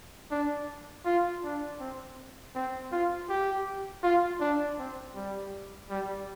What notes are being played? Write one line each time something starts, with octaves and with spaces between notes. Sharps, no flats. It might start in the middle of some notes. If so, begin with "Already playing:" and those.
D4
F4
D4
C4
C4
F4
G4
F4
D4
C4
G3
G3